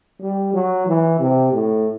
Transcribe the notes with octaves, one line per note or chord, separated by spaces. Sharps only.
G3
F#3
E3
C3
A2